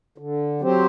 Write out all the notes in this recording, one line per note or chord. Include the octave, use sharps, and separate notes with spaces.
D3
F#3 C4 G4 C5